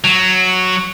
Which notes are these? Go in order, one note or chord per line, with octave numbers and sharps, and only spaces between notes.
F#3